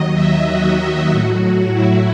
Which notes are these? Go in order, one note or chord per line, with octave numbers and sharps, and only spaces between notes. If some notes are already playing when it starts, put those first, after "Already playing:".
Already playing: D#2 D#3 F#3 D#5
E5
F#4
A2 F#3 F#4
E4